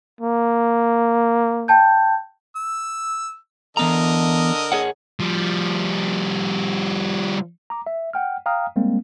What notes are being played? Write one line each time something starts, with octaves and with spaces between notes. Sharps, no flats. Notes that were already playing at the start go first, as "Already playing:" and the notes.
A#3
G5 A5 G6
E6
D3 E3 B3 A#4 D#5 A#5
G#4 C#5 F#5
F3 G3
A#5 D6
E5
F#5 G5 F6
F5 G5 A#5 D#6 F6
G3 G#3 A#3 C4